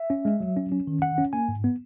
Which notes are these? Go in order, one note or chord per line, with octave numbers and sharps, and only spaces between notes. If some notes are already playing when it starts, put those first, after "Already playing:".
Already playing: E5
C#4
G#3
F#3
C#4
C#4
D#3
D#3 F#5
C#4
A#3 G#5
G#2
B3